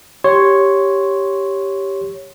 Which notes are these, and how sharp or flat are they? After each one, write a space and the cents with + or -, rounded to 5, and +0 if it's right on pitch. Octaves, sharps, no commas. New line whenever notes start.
G4 +0 C#5 +0 C6 +0